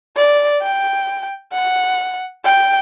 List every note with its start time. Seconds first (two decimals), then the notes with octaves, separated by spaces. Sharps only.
0.17 D5
0.62 G5
1.53 F#5
2.45 G5